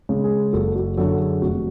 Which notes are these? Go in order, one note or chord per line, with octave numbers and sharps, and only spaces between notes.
C#3 G#3
G#4
F#1 F#4 A4
F#4
F#2 D3 F#4 A4
G#4
F1 F#4